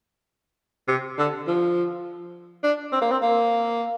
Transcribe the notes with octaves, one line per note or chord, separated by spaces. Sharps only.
C3
D3
F3
D4
C4
A#3
C4
A#3